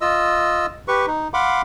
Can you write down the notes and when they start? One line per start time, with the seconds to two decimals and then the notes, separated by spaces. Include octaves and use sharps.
0.01 F4 D#5 E6
0.88 G4 B4 C#6
1.07 D#4
1.34 F5 F#5 B5 C6 D6